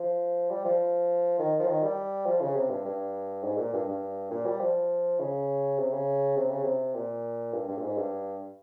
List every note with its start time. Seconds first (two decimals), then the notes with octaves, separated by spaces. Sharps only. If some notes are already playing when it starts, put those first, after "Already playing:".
Already playing: F3
0.51 G3
0.65 F3
1.39 D#3
1.60 F3
1.68 D#3
1.82 G3
2.26 F3
2.41 C#3
2.56 C3
2.70 G2
2.85 G2
3.43 G#2
3.58 A#2
3.73 G2
3.88 G2
4.31 A#2
4.46 G3
4.60 F3
5.19 C#3
5.78 C3
5.93 C#3
6.37 C3
6.50 C#3
6.63 C3
6.94 A#2
7.53 G2
7.68 G2
7.77 A#2
7.82 G#2
7.98 G2